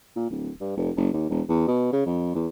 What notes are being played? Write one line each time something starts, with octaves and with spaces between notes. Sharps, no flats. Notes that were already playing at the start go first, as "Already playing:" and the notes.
A#2
D1
G2
F1
F#1
D#2
E1
E2
B2
C#3
F2
E2